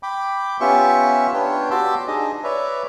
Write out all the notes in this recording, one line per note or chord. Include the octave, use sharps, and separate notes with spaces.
G5 B5 D6
B3 C#4 F4 G4 E5 C#6
B3 D4 F4 B4 C#5 G5
F#4 G4 A5 C6 D6 E6
D4 D#4 G#4 D#5
B4 C#5 D5 E5